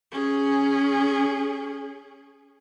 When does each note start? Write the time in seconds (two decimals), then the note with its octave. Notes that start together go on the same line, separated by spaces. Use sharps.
0.12 C#4 G#4